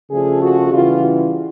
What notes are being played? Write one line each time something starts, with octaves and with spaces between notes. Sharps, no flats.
C#3 F3 A3 D4 F4 G#4
F#4
C#3 E3 G3 B3 E4 F4